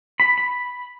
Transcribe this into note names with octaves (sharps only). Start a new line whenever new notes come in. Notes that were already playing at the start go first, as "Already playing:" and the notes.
B5
B5